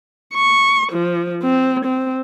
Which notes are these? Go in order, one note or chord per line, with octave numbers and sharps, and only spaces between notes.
C#6
F3
C4
C4